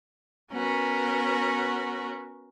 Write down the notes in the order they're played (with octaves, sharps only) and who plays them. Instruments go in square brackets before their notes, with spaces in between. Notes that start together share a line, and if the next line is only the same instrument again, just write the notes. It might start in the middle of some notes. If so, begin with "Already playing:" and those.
[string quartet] B3 C#4 F#4 A#4